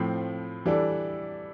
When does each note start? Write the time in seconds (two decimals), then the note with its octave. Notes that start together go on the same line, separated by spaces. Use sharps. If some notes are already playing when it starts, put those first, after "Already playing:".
Already playing: A2 F3 C4
0.66 E3 G3 D4 A4